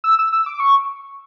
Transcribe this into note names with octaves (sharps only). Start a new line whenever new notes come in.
E6
E6
E6
D6
C#6